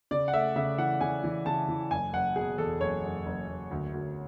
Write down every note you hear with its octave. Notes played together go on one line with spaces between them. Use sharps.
C#3 D5
F#5
A3 E5
C#3 E5
E3 F#5
C#3 G#5
E3
C#3 A5
E3
F#1 G#5
F#1 F#5
B2 G#4
E2 A4
F#1 C#5
F#1
F#1
F#1
D2
D2